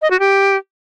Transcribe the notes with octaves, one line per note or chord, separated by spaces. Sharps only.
D#5
F#4
G4